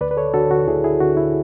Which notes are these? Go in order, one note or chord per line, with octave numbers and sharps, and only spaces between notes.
D2 B4 D5
B4
A4 C#5
D3 F#4 A4
F#4
D2 E4 G#4
E4 G#4
D3 F#4
E4